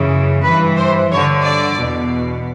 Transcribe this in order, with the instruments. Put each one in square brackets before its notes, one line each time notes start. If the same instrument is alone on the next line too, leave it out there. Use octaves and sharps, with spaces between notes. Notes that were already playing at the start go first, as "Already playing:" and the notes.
Already playing: [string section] F#2 C#3 E3
G2 E3 B4
C5
G2 D3 C#5
D5
E2 B2